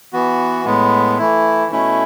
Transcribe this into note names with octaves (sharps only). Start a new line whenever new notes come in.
E3 B3 F#4
A2 G#3 B3
E3 A3 E4
B2 A3 C#4 E4